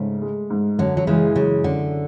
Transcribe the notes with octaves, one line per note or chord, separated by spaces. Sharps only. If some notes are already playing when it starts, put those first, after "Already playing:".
Already playing: G#2 C#3 A3
G#3
G#2
F#2 D3 F#3
F#3
C#3 E3 G#3
F#2 C#3
D3 C#4